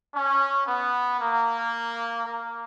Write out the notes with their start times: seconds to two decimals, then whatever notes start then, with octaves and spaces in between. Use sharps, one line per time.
0.14 C#4
0.66 B3
1.19 A#3
2.26 A#3